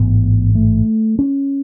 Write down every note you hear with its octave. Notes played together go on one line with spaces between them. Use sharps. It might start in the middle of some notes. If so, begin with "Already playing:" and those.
Already playing: A1 G#2 B3
A3
C#4